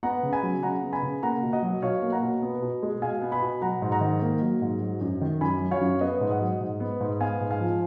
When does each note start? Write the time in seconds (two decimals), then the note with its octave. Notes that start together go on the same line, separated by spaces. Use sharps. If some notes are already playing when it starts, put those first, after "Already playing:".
0.03 B3 F#5 A#5
0.23 C#3
0.33 G#5 B5
0.43 F#3
0.63 C#3 F#5 A#5
0.83 B3
0.93 G#5 B5
1.03 C#3
1.22 A#3 F#5 A#5
1.43 B2
1.52 D#5 F#5
1.63 F#3
1.82 B2 C#5 F5
2.02 A#3
2.12 F#5 A#5
2.22 B2
2.42 B3
2.62 B2
2.83 G#3
3.02 B2 F5 G#5
3.22 B3
3.32 G#5 B5
3.42 B2
3.62 F#3 F#5 A#5
3.82 G#2
3.92 F#5 A#5
4.01 D#3
4.21 A#3
4.41 F#3
4.62 G#2
4.82 F#3
5.01 F#2
5.21 D#3
5.41 F#2 G#5 B5
5.61 F#3
5.71 C#5 F5
5.81 F#2
6.01 B3 B4 D#5
6.21 G#2
6.31 D#5 F#5
6.41 F#3
6.61 G#2
6.80 B3
7.00 G#2
7.20 B3 F5 G#5
7.41 G#2
7.51 F5 G#5
7.60 F3